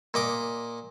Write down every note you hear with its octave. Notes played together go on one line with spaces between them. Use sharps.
A#2 D#5 D6